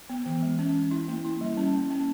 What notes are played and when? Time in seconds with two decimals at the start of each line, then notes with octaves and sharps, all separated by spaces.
0.10 B3
0.26 E3
0.42 G#3
0.59 C#4
0.75 C#4
0.91 E4
1.08 A#3
1.24 E4
1.41 G3
1.57 C#4
1.74 A#3
1.90 C#4